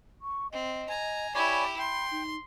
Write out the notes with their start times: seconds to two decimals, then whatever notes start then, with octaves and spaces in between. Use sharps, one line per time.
0.21 C#6
0.52 C4 D#5
0.89 G#5 A#5
1.35 E4 G4 C#5 D5 G#5 B5
1.79 G5 C6
2.12 D#4